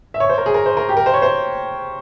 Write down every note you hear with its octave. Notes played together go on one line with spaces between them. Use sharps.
E5
C#5
C5
A#4
G#4
A#4
C5
A#4
G4
A#4
C5
C#5
C5